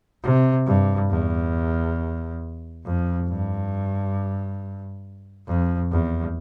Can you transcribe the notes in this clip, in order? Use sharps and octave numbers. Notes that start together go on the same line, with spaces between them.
C3
G2
E2
F2
G2
F2
E2